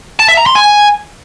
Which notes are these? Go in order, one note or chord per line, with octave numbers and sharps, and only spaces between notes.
A5
E5
A#5
C6
G#5